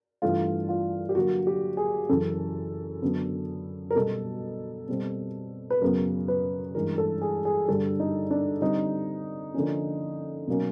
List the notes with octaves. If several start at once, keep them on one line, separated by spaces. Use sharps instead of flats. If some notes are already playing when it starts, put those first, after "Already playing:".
G2 E3 A3 F4
F4
G4
D3 F#3 A#3 F#4
G4
G#4
F#2 C#3 E3 A4
F#2 D3 F#3 B3
A#4
B2 G3 B3 A4
B2 G3 C4
B4
F#2 C#3 F#3 B3 A#4
B4
G2 E3 G#3 A#4
A4
G#4
G#4
G2 D3 G3 A4
D#4
D4
D3 G3 C4 D#4
D3 F3 A#3 C#4
B2 F#3 A#3 C#4